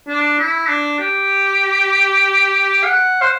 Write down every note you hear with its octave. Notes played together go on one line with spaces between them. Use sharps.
D4
E4
D4
G4
F#5
C5